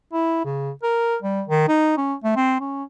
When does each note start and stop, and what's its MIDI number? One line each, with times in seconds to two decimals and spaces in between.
0.13 0.41 64
0.45 0.70 49
0.83 1.16 70
1.22 1.42 55
1.48 1.64 51
1.68 1.96 63
1.97 2.14 61
2.24 2.34 57
2.36 2.59 60
2.60 2.83 61